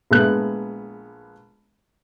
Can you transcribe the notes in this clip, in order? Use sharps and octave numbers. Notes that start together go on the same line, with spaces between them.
A#1 G#3 A3 B3 F#6